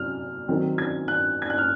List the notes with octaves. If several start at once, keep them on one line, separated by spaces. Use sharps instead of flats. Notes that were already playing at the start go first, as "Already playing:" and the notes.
Already playing: C3 F#3 F6
D#3 F#3 C4
G#6
F#6
G#6
F#6
F6